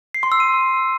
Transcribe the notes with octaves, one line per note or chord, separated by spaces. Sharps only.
C7
C6
E6
D#7